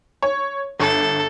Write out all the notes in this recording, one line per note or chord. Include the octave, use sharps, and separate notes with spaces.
C#5
G1 A4